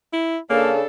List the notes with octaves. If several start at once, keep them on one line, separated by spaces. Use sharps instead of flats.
E4
C#3 A#3 D4 A4